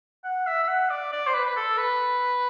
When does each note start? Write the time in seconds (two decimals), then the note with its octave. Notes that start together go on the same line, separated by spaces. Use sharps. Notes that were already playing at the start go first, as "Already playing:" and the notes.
0.25 F#5
0.47 E5
0.64 E5
0.68 F#5
0.90 D5
1.13 D5
1.27 C5
1.34 B4
1.45 B4
1.57 A4
1.78 B4